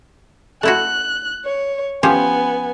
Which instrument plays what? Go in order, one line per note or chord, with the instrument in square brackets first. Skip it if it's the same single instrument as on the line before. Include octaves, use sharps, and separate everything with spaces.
[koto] A3 E4 F#4 [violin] F#6
[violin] C#5
[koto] F3 C#4 G4 [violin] B3 G#5